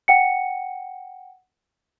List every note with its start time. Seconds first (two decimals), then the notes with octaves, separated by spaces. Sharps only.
0.08 F#5 G5 C#7